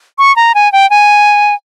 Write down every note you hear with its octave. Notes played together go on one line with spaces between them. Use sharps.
C#6
A#5
G#5
G5
G#5